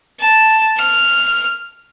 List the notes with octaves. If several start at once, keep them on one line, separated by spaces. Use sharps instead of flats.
A5
F6